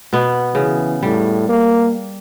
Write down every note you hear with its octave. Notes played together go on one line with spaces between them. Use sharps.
B2 B3
C#3 E3
A2 G3
A#3